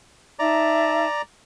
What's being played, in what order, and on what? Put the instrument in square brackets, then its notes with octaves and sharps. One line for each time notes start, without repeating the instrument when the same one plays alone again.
[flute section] D#4 E5 A5 [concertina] D5 A#5